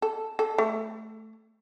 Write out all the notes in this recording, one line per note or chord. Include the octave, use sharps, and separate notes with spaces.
A4
A4
A3